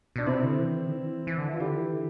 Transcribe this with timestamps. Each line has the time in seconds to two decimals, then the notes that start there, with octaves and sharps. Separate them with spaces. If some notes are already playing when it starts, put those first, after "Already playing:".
0.16 B2 D4
0.26 C3 C4 E4
0.43 D3
0.59 E3
0.88 D3
0.93 E3
1.27 E3
1.38 D3
1.48 E3
1.54 F4
1.60 D3 E4 G4
1.77 E3
1.93 D3